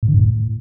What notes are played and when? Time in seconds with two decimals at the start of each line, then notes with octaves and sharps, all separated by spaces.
0.03 A2
0.08 D3
0.14 G2
0.19 A2